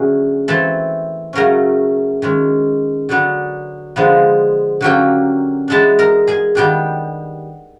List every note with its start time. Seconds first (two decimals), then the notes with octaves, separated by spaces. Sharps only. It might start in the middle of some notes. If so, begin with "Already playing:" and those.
Already playing: D3 F#3 A3 C#4 G#4 G#5
0.48 E3 A3 C4 A4 A5
1.33 C#3 F#3 A3 C#4 A#4 A#5
2.22 D#3 G#3 C#4
3.09 D3 F#3 B3 D4
3.96 D3 F3 G#3 B3
4.81 D3 F#3 A#3 C#4 G4 G5
5.68 E3 G#3 B3 D4 A4 A5
5.99 A#4 A#5
6.27 G#4 G#5
6.55 D#3 G3 B3 D4 G4 G5